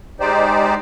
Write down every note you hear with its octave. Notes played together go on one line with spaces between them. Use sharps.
G#3 D#4 G4 C5 D5